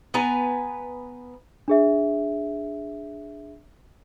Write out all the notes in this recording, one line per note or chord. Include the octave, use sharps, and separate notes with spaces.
B3 B4 G#5 A#5
D4 G#4 E5